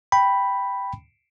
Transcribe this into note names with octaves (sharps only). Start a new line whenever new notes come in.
G5 B5